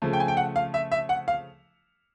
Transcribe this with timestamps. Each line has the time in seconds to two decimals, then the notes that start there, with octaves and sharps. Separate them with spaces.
0.02 C#3 F3 A3
0.13 G5
0.20 G#5
0.28 G5
0.37 F#5
0.56 F5
0.74 E5
0.92 E5
1.09 F#5
1.28 F5